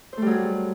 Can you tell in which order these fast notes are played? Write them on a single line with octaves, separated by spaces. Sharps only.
C5 A3 G3 F#3 G#4